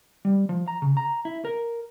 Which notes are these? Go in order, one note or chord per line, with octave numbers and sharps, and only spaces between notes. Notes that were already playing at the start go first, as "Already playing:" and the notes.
G3
F3
A#5
C#3
A#5
E4
A#4